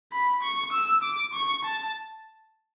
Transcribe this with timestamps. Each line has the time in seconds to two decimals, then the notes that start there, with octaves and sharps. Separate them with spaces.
0.13 B5
0.43 C#6
0.72 E6
1.03 D6
1.33 C#6
1.65 A5